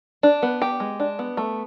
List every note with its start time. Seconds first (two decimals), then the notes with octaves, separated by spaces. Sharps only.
0.23 D4
0.43 B3
0.62 G4
0.80 G#3
1.00 D4
1.19 B3
1.37 A3